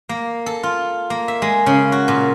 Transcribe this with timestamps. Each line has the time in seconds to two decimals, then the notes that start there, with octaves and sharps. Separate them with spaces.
0.09 A#3
0.46 A4
0.63 F4
1.10 A#3
1.28 E5
1.42 G#3
1.66 C#3
1.92 F#4
2.08 A#2